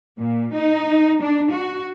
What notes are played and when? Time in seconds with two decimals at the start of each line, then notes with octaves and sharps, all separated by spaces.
0.19 A#2
0.52 D#4
1.22 D4
1.51 F#4